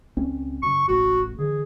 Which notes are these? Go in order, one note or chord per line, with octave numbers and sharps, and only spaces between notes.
C#2 C4 C#4
F#2 C#3 C#6
E1 A1 A2 F#4
D3 E3 G#4